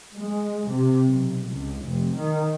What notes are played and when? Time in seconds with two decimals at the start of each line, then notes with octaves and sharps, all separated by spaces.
0.18 G#3
0.69 C3
1.06 B1
1.46 C#2
1.83 F1
2.16 D#3